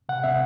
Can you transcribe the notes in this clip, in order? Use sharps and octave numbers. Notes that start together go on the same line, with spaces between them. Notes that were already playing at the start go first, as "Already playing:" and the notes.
C3 F#5
C3 E5